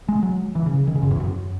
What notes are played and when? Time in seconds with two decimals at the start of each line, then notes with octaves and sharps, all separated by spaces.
0.09 G#3
0.23 F#3
0.55 E3
0.66 C#3
0.87 D#3
0.95 C#3
1.03 F#2
1.11 E2
1.20 F#2